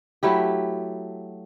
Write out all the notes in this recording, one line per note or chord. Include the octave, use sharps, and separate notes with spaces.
F#3 A3 E4 G4